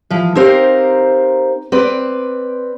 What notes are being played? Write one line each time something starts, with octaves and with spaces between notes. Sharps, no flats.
E3 F3
C4 D#4 G4 A#4 C5 F5
C4 B4 D5